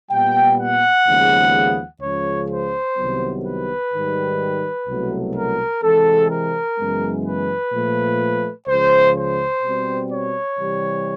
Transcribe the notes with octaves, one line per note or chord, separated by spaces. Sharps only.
A#2 G3 B3 G5
F#5
D#2 C#3 F3 G#3 B3
C#2 C#3 F3 C#5
C5
C2 C3 D#3 F#3 B3
B4
G#2 D#3 G3
C2 B2 F#3 A3
A#4
C3 E3 G#3 C4 A4
A#4
F#2 C#3 E3 G#3 B3
B4
A#2 F3 A3
C#2 C#3 F3 C5
C5
B2 G3 C4
C#5
C3 E3 G3